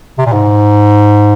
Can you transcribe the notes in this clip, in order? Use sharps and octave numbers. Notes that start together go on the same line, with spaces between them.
C3
A#2
G#2